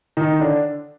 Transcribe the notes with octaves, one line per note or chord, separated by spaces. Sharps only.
D#3 D#4
D3 D4